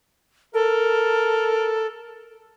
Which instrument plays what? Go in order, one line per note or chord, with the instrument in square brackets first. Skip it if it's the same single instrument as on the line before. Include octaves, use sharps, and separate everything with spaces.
[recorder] A4 [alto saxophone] A#4